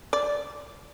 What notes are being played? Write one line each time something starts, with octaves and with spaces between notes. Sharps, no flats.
D5